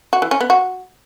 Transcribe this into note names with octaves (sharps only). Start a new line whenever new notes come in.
F#4
E3
C#4
B3
F#4